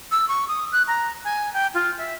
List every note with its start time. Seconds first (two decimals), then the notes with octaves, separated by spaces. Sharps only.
0.11 E6
0.28 C#6
0.48 D#6
0.72 F#6
0.88 A#5
1.25 G#5
1.53 G5
1.74 F4
1.98 E5